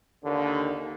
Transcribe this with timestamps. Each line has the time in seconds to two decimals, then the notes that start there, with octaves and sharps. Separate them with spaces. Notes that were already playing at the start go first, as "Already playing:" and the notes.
0.24 D#2 D3